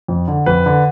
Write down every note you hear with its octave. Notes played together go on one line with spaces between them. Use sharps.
F2
D3
F2 B4
D3